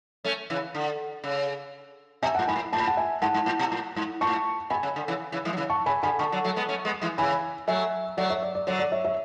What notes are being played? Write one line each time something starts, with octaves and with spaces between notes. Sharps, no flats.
A3 C#4
C#3 E3
D3
C#3
B2 E5 G#5
A2 F#5 A5
G#2 G#5 B5
A2
A2 A5
B5
F#5 A5
E5 G#5
G#2 F#5 A5
G#2
A2
B2
A2
G#2
A2 A5 C#6
B2 G#5 B5
C#3
D3
C#3 E3
C#3 E3
E3 G#3
F#3
C#3 E3
A5 C#6
C#3 G#5 B5
D3 G#5 B5
D3 A5 C#6
D3 F#3
F#3 A3
G#3 B3
A3 C#4
G#3 B3
E3 G#3
C#3 E3 G#5 B5
F#3 A3 E5 G#5
F#3 A3 D5 F#5
C#5 E5
D5
D5
D3 F#3 C#5
D5
C#5 E5
C#5 E5